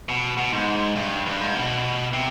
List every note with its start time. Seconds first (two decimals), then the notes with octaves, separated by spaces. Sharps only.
0.09 B2
0.37 B2
0.52 G#2
0.96 G2
1.26 G2
1.41 G#2
1.55 B2
2.13 C3